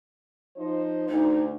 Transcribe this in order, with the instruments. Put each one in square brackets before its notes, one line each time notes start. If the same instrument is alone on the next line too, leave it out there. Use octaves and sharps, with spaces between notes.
[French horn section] F3 D#4 C5
[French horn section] D2 [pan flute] D#4